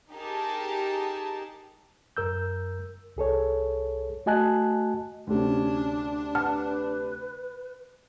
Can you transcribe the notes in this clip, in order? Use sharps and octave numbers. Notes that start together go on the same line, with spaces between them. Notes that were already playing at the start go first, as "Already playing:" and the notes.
D#4 G4 G#4 A#4 A5
F#2 A#4 E6 G6
C2 G#4 A4 C#5
A3 F#4 D#5 G#5 A5 F#6
D2 C3 C#4 D4
B4 F#5 A5 F6